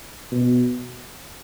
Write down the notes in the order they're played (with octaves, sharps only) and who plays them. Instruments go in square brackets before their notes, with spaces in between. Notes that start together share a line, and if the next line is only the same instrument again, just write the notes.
[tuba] B2